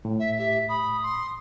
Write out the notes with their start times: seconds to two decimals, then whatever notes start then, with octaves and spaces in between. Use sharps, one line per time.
0.05 A2
0.19 E5
0.38 G4 E5
0.69 B5 D#6
1.02 C6